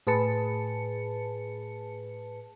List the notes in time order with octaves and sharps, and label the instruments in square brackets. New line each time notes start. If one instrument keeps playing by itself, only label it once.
[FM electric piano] A2 G#4 B4 A5 C#7